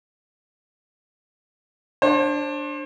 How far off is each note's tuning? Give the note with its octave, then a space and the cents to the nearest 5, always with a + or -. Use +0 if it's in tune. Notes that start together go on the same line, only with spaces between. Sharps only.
D4 +0 C5 +35